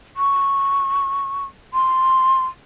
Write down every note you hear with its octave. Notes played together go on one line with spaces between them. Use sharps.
C#6
C6